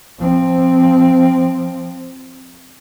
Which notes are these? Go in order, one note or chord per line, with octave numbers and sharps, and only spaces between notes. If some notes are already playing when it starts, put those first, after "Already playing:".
F3 C4